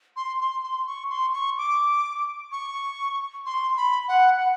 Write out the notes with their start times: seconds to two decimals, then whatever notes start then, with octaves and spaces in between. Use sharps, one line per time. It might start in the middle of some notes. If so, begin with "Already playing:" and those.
0.16 C6
0.40 C6
0.64 C6
0.87 C#6
1.10 C6
1.34 C#6
1.58 D6
2.52 C#6
3.46 C6
3.77 B5
4.08 F#5
4.40 F#5